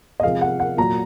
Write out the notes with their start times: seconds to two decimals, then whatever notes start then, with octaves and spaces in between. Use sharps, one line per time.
0.20 D#5
0.23 C3 F3 G#3 F5
0.41 F#5
0.60 F#5
0.77 A#2 F#3 A#5